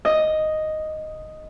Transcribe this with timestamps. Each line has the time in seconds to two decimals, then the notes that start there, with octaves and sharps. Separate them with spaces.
0.05 D#5